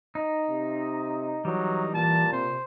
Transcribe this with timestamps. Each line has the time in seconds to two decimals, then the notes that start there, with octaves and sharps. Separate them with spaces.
0.15 D#4
0.50 C3
1.45 E3 F#3 G3 D#4
1.94 A#2 A5
2.33 C3 C5